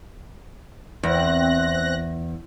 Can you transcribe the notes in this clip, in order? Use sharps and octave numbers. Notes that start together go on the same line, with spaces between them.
E2 C4 F#6 A#6